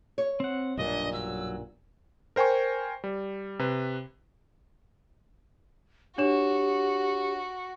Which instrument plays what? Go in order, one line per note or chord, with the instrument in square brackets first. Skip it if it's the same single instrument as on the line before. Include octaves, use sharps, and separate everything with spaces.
[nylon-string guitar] C#5
[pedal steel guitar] C4 F#5
[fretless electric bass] B1 G2 A#2 [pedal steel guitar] D4 [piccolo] D#5
[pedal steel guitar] F#3 [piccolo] E6
[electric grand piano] A#4 C5 G5 G#5 C#6
G3
C3 B4
[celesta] D4 C#5 E7 [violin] F#4 [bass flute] G4